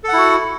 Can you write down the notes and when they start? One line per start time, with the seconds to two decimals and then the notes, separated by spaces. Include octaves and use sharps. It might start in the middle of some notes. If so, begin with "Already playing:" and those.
0.04 A4
0.08 F#5
0.13 E4
0.17 F#4